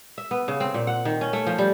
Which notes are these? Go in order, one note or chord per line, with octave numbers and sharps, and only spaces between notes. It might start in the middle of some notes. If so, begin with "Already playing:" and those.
E5
B3
C#3
C4
A#2
F#5
D#3
C#4
A3
F3
G3